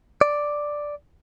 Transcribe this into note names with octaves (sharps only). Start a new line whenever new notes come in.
D5